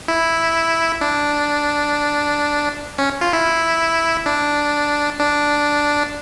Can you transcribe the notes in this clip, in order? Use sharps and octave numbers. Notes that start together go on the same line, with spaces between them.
E4
D4
C#4
F4
E4
D4
D4